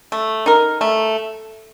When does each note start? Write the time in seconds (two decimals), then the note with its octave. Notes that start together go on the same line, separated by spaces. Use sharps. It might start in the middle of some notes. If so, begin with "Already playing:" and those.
0.12 A3
0.46 D#4 A#4
0.81 A3